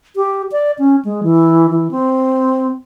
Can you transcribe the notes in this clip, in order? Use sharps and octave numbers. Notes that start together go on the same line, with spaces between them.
G4
D5
C#4
G#3
E3
E3
C4